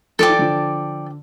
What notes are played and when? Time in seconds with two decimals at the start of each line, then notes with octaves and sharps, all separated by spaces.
0.19 F3 A4 D5 G5 D6
0.29 E3
0.39 D3 F3